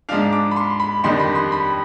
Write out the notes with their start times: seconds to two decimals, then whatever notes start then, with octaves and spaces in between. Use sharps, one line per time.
0.09 G#2 F3 G#3 D4 F5
0.33 D6
0.51 B5
0.56 C6
0.80 B5
1.04 F2 D#3 G3 D4 C6
1.20 B5
1.35 C6
1.52 B5